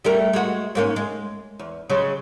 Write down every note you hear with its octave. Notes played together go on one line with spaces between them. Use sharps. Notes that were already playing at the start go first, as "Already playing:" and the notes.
G3 A3 A#4
G#3 F#4
G#2 A#3 C#4
G#3
E2
C#3 F#3 G#3